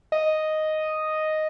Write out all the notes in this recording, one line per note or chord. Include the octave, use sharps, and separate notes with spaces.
D#5